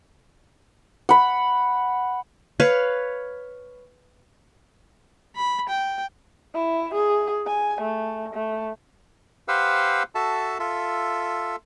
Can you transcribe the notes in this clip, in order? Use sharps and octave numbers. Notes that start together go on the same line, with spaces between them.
F#5 B5
B4 C#5 F5
B5
G5
E4
G#4
G#5
A3
A3
G4 B4 C5 F5 F#5 E6
F#4 A4 E5 A5
F4 A4 E5